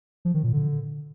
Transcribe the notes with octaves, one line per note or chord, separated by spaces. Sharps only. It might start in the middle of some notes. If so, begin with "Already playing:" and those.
F3
D#3
A#2
D3